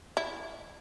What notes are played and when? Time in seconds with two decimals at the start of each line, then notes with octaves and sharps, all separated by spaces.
0.17 E4